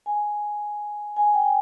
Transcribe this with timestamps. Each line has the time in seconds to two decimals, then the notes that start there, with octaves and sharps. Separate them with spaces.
0.06 G#5
1.16 G#5
1.34 G5